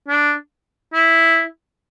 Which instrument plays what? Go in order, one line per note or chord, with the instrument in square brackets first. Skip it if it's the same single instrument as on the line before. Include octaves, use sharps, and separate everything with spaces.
[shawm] D4
E4